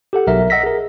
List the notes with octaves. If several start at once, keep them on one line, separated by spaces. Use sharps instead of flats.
G4 A4 F#5
B1 A#4 E5
D#5 F#5 E6 A#6 B6
G#4 A#4